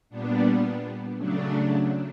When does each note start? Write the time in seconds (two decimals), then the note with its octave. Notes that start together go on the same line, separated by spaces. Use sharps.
0.09 A#2 G3 B3 D4
1.17 C#3 F#3 A3 D4